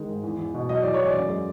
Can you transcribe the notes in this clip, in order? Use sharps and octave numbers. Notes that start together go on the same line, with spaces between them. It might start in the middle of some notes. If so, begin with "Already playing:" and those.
Already playing: D#3 G#3
G#2
E2
E2
B2
F#3 D#5
E2 D5
C#5
E2
D5
F#2
G#3